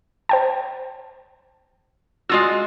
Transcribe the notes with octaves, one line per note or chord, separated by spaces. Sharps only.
C5 G5 A5
G#3 F4 F#4 E6